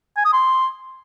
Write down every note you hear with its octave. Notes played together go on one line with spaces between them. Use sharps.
G#5
D#6
C6